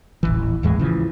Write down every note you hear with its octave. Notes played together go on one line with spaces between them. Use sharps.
D#1 A1 E3
D#2 A2 E3 G#3
C#3 E3 F3